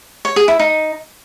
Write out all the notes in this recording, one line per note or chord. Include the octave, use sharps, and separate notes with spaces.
C#5
G#4
E4
D#4